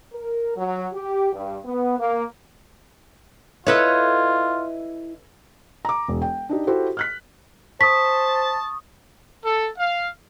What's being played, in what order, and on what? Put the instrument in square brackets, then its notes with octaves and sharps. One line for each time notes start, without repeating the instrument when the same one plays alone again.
[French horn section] A#4
F#3
G4
G2
B3
A#3
[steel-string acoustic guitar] E4 D#5 [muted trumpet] F4 [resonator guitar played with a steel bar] A4 B4 C#5
[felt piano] A#5 D6
E1
G5
D4 D#4 G4
E4 F#4 G4 A4 C5
F6 F#6 B6
[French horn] C5 [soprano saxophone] A5 [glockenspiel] C#6 D#6 [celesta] B6
[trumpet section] A4
F5